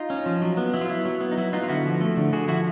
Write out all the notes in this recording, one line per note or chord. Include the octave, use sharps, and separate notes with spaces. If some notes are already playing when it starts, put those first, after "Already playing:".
Already playing: D#4 F4
C#4
F3
F#3
B3
F#3 E4
F4
B3 E4
F#3
B3
D#4
F#3 E4
B3 D#4 F4
F4
D3 E4 F#4
F3
A3
D3
D3 F#4 G#4
F3 E4 F#4